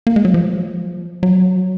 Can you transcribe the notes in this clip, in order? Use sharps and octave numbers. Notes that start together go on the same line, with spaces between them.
A#3
G#3
F#3
F3
F#3